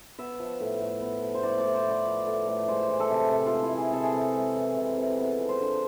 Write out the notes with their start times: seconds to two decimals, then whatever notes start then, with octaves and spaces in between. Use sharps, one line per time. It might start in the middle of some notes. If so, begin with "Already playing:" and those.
0.19 B3 E5
0.39 F3
0.60 A2
0.81 A2
1.02 B3
1.22 F3
1.34 C5
1.43 A2 D5
1.59 D5
1.64 A2
1.75 C5
1.85 B3
1.91 D5
2.05 F3
2.27 A2
2.47 A2
2.68 G#3 C5
2.89 E3
3.00 A4
3.10 C3
3.30 C3
3.46 F4
3.52 G#3
3.62 E4
3.72 E3
3.77 G#4
3.93 C3 A4
4.03 G#4
4.12 C3 A4
4.35 G#3
4.56 E3
4.76 C3
4.97 C3
5.18 B3
5.39 F3
5.49 C5
5.60 D3